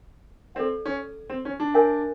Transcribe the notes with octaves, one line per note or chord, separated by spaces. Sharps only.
C4 A4 D5 F5
C#4
C4
C#4
D4
A#4 C#5 E5 G#5